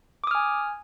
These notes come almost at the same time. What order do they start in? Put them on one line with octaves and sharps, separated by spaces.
D6 D#6 F6 G#5